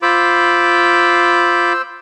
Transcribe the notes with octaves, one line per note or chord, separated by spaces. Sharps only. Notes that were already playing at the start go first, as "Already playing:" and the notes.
F4 C5 B5 D6 E6